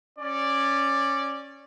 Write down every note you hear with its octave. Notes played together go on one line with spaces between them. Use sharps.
C#4 D5